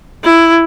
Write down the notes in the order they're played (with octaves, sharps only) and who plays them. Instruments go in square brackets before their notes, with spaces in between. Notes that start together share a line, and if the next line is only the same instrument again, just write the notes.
[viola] E4